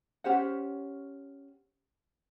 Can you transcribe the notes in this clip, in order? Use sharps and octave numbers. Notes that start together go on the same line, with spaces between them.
C#4 G4 C5 F#5